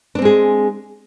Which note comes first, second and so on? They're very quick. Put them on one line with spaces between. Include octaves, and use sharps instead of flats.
D4 C4 G#3 G#4